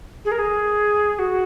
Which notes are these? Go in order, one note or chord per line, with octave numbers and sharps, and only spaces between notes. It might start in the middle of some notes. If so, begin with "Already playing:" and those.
G#4
A#4
G#4
F#4